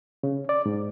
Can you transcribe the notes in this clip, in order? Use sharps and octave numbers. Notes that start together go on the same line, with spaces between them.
C#3
D5
G#2